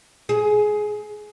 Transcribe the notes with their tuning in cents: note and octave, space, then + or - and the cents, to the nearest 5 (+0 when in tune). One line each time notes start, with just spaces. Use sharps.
G#4 +15